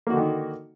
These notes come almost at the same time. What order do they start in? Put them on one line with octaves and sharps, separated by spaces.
A#3 F#4 D3 D#3